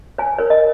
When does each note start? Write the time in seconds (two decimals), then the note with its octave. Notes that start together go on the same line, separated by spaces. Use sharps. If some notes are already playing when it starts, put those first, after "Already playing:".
0.18 C#5 G#5
0.39 A#4 C#5
0.50 D#5